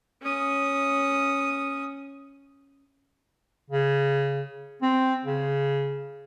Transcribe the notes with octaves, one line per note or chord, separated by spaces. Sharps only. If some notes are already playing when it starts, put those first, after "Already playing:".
C#4 D#6
C#3
C4
C#3